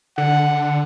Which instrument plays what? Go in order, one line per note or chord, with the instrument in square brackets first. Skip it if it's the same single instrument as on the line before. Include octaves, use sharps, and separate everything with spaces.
[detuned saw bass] D3 [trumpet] F#5